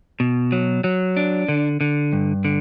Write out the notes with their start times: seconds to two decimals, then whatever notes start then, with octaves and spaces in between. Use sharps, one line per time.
0.20 B2
0.52 F#3
0.84 F#3
1.17 D4
1.48 D3
1.81 D3
2.13 G2
2.45 D3